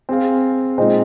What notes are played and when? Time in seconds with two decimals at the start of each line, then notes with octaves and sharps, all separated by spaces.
0.09 C4 G#4 F5
0.78 A#2 G#3 C4 D#4 C5